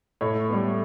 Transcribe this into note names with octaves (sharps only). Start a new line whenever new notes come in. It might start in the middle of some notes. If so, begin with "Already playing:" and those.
A2 C#5
G3 B3